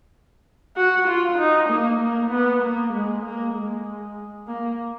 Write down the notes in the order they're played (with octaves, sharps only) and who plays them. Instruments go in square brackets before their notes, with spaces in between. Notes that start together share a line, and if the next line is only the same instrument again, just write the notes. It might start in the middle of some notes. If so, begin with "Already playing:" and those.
[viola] F#4
F4
D#4
A#3
A#3
B3
A#3
G#3
A#3
G#3
A#3